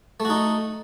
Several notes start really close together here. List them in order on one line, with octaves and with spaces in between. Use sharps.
A3 F#4 D#4